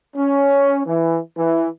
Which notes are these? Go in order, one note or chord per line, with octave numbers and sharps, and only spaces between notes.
C#4
E3
E3